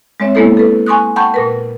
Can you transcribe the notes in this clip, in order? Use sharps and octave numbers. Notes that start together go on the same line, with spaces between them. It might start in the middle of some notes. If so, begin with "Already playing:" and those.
G#3 C4 C#5 E5
G#3 A#3 B3 E4 A4 C5
A4 B4
G#5 C6 C#6 D#6 F#6
F#5 G5 A5 B5 C#6 G6
A#2 A#4 B4